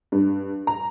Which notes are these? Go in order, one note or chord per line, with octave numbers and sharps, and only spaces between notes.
G2
A#5